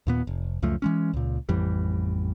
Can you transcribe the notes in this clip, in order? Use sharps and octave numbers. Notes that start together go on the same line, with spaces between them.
D#2 A#2 B3
F1
C#2 F#2 F3 A3
E3 G#3 C#4
C#2 A#2
A1 F2 E3 G3